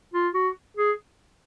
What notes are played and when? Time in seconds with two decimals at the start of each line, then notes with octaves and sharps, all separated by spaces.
0.13 F4
0.34 F#4
0.77 G#4